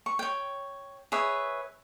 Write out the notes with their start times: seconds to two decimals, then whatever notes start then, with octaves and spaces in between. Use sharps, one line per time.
0.06 C#6
0.19 C#5 G5
1.12 G#4 B4 C#5 E5